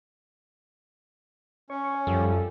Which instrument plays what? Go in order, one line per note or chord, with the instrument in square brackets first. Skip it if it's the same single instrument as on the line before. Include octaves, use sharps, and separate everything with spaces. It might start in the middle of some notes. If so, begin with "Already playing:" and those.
[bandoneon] C#4 [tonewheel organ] C#5
[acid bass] F#2 [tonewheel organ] F3 G3 [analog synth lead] A4